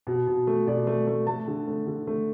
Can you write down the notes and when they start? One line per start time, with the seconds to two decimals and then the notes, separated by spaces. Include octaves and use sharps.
0.07 B2
0.27 B2
0.47 A3
0.67 B2 D5
0.87 A3
1.07 A3
1.27 A3 A5
1.47 D3
1.67 A3
1.87 D3
2.07 A3